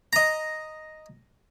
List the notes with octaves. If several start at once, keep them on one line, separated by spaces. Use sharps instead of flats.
D#5 A#5